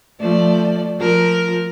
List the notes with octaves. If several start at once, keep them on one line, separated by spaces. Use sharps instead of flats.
F3 A3 D5
F3 A#4